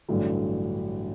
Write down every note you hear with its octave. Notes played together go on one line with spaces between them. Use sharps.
A1 G2 D3 F#3